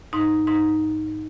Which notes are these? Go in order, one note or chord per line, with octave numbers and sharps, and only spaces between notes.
G#2 D#4
G#2 D#4